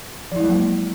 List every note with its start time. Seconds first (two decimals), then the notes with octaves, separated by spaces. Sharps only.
0.32 F3
0.36 E4
0.40 G#3
0.44 F#3
0.49 A#3